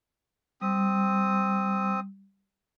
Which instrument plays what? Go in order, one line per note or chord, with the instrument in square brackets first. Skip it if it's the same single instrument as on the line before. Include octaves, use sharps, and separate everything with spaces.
[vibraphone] G3 [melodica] C4 D#6